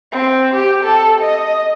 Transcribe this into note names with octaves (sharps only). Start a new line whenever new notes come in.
C4
G4
A4
D#5